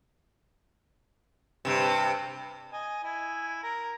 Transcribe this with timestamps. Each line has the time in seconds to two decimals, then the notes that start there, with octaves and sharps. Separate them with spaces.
1.65 G2 C3
2.73 D#5 G#5
3.03 E4 G#5
3.63 A#4